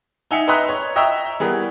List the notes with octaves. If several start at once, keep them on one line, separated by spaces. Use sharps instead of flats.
D#4 E5 G#5 C#7
B4 D#5 E5 A#5 C6 F#6
C#5
D#5 E5 G5 A#5 C#6 E6
E3 G3 B3 G#4 A#4